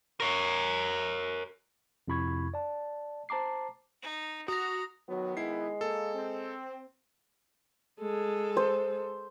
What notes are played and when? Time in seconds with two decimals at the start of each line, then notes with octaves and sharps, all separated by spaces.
0.20 A#4 C#5
2.08 F2 C3 E4 B5 C#6 G#6
2.54 D5 A5
3.29 C5 A5 A#5 D6 C7
4.02 D#4
4.48 F#4 A#5 D#6 A#6
5.09 D#3 F#3 B3
5.37 G#3 E4 C7
5.81 A#3 A4
6.14 C4
8.00 G#3 A4
8.57 C5